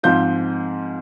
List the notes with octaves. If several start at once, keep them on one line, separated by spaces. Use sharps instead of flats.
G#2 F3 C4 F4 G6